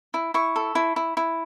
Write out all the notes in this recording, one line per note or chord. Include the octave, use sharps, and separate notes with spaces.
E4
E4 C#6
A4
E4
E4
E4